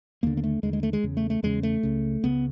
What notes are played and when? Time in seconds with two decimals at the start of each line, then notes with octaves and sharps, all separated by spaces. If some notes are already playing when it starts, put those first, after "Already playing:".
0.23 D#2 D3 A#3
0.37 A#3
0.44 A3
0.63 D#2 D3 G#3
0.73 G#3
0.83 A3
0.93 G#3
1.03 E2 C#3
1.17 A3
1.30 A3
1.43 E2 C#3 G#3
1.63 A3
1.83 C#2 C#3
2.23 C#2 C#3 B3